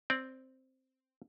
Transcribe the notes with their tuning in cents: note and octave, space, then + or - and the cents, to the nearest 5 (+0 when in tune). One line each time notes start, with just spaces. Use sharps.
C4 +0 D5 -15